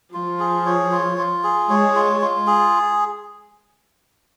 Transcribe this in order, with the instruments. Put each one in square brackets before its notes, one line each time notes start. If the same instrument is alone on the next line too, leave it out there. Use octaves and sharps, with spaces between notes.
[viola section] F3 [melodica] F4
[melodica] G#4
C#5
F4
F4
G#4
[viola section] G#3 [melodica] C#5
[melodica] F4
F4
G#4